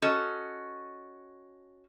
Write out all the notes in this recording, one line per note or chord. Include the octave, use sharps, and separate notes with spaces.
C#4 F#4 A4 D#5